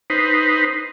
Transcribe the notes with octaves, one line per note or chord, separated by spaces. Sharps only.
D#4 B4 C5